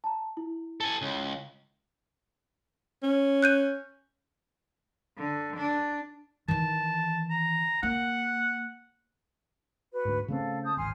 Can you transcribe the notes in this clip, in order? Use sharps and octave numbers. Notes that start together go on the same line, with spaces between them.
A5 A#5
E4
A4 G#5
C#2
C#4
F#6 G6 D#7
D3
D4
D#3 E3 A5
A#5
A#3 F#5
F#4 B4
D2 G#2
C#3 A3 C4 A4 F5
A5 D#6 G6
D1 G#1 G#5 C6 F6